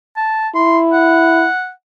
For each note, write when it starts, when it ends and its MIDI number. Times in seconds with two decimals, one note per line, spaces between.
0.17 0.48 81
0.55 1.46 64
0.55 0.79 84
0.93 1.71 78